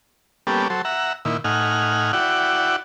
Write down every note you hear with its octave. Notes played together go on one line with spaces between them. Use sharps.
G3 A#3 B3 C#4 G4 A4
F#3 A4 C5
E5 F#5 A#5
A#2 D#3 E4
A2 D#4 F#5 G#5 F6
E4 F#4 D5 F#5 G5